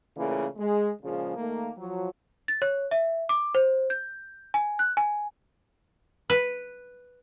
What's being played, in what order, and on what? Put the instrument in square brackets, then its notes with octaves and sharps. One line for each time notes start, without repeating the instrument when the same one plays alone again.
[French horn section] A#2 C#3 E3 A3 A#3
G#3
A#2 C#3 F3 G#3
D#3 A3 A#3
F3 F#3
[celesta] A6
C#5
E5
D6
C5
G6
G#5
F#6
G#5
[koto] B4